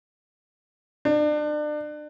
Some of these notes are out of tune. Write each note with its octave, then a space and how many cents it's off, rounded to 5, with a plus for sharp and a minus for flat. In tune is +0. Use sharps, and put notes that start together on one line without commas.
D4 +35